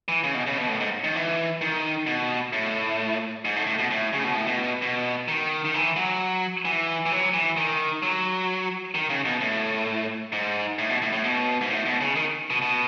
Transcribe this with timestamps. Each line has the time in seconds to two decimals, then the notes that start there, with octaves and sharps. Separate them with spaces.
0.08 E3
0.24 C#3
0.34 B2
0.47 C#3
0.58 B2
0.69 A2
0.80 G#2
1.04 D#3
1.15 E3
1.61 D#3
2.07 B2
2.53 A2
3.45 G#2
3.56 A2
3.67 A2
3.79 B2
3.91 A2
4.13 C#3
4.24 B2
4.35 A2
4.47 B2
4.82 B2
5.28 D#3
5.65 D#3
5.74 E3
5.96 F#3
6.65 E3
7.06 E3
7.12 F#3
7.34 E3
7.57 D#3
8.03 F#3
8.95 D#3
9.10 C#3
9.25 B2
9.41 A2
10.32 G#2
10.79 A2
10.90 B2
11.02 A2
11.12 A2
11.24 B2
11.61 G#2
11.70 A2
11.86 B2
12.01 C#3
12.16 D#3
12.50 B2
12.62 B2